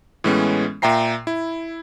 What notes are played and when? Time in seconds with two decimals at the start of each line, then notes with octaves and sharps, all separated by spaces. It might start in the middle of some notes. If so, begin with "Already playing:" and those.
0.24 A2 E3 G#3 B3 C#4
0.82 A#2 E5 G5 A#5 C7
1.27 E4